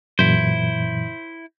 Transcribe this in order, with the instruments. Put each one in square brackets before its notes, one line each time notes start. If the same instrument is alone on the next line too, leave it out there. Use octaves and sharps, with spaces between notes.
[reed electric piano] F#2 A#2 E3 [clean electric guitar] E4 C5